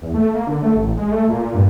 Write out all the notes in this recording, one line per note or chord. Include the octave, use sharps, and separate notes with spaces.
E2
A3
A#3
D3
A3
A1
G#3
A3
A#2
G2